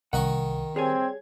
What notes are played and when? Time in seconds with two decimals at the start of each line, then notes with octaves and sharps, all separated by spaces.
0.13 C2 D#3 D#5 F#5 C#6
0.76 G3 C4 G#4 C#5 G#5 G#6